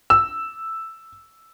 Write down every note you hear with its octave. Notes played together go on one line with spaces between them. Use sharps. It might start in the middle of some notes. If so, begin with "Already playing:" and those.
E6